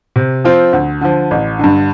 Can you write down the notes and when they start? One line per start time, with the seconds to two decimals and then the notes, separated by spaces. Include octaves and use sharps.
0.16 C3
0.44 F3 C4 F4
0.73 D2
1.01 D3 F3
1.31 A1
1.59 G2 D3